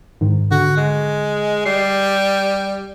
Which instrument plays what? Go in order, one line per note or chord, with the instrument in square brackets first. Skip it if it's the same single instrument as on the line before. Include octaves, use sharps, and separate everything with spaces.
[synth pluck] G#2 D#3
[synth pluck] D3 [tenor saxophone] F#4
[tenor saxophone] G#3
[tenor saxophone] G3 [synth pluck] C7